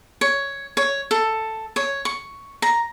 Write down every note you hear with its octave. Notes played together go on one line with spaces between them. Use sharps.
C#5
C#5
A4
C#5
C#6
A#5